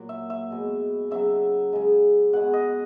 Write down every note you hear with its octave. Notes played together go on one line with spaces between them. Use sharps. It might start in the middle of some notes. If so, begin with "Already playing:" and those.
Already playing: A#2 F#3
E5
E5
B2 G#3
C#3 F#3 E5
C#3 G#3
B2 G#3 F#5
D#5